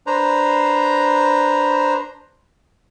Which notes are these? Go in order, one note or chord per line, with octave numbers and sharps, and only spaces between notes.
D4 B4 C5 A#5